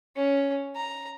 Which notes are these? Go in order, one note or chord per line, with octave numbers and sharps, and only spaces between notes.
C#4
A#5